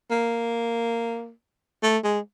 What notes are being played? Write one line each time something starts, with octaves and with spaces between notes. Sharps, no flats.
A#3
A3
G#3